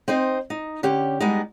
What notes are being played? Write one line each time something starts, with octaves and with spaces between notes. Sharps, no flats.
C4 D#4 C5 D#5
D#4
D3 C#4 G4
G3 G#3 B3 D#4